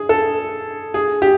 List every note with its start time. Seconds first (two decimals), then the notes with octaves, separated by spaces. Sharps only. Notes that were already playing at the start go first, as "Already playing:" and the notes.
Already playing: G#4
0.09 A4
0.94 G#4
1.22 G4